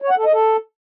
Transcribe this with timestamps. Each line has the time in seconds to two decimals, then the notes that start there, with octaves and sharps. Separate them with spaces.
0.02 C#5
0.10 F#5
0.17 A4
0.25 D#5
0.33 A4